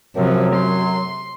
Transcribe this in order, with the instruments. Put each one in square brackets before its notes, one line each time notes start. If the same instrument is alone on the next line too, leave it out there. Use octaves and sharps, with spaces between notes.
[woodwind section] F#2 F#3 [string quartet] C3 F3
[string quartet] C6